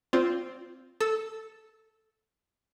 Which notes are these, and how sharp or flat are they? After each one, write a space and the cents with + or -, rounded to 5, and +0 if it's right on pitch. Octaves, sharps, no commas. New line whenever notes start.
C4 +0 F4 +0 D5 -25
A4 +0 E6 -20